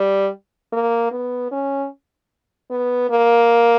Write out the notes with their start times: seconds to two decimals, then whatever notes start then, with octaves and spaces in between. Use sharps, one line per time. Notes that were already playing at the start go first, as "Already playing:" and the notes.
Already playing: G3
0.72 A#3
1.12 B3
1.51 C#4
2.71 B3
3.10 A#3